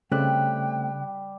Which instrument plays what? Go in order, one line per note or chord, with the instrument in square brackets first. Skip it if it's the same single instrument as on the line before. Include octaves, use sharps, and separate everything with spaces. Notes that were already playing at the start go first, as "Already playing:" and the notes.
[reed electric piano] C#3 F#6 [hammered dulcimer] G3 G4 [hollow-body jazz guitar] A3 C4 [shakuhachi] G5